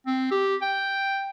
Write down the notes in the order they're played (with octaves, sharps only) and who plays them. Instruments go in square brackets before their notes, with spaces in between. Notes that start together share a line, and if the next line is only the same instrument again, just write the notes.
[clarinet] C4
G4
G5